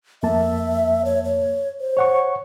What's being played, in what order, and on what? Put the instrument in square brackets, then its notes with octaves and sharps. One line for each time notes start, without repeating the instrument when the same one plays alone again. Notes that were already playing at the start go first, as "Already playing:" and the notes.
[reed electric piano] F2 A#3 A5 [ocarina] E5
[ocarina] C#5
C#5
C5
[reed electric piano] C#5 F#5 C#6